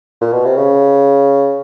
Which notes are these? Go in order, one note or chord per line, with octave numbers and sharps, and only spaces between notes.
A#2
B2
C3
C#3